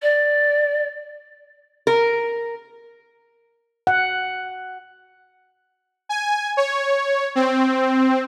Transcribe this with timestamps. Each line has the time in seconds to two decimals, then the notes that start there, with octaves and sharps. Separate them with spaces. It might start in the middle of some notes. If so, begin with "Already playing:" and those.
0.02 D5
1.87 A#4
3.87 F#5
6.09 G#5
6.57 C#5
7.35 C4